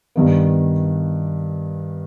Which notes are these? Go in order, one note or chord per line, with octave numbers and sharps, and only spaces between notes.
G2 D#3 B3